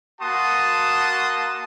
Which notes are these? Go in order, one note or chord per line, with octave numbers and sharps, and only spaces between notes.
A#3 F#4 F#5 A5 C6 D#6